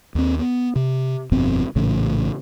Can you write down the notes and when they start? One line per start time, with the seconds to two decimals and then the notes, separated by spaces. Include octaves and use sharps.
0.15 D#2 C4
0.39 B3
0.76 C3
1.32 G1 F2 B2 C4
1.76 A#1 A2 C#3 E3